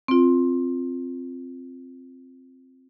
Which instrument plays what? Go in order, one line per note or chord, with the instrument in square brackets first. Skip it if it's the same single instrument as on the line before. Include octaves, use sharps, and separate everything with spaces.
[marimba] C4 F4